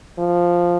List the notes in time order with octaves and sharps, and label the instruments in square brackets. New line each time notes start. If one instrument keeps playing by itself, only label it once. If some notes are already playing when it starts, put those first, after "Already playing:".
[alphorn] F3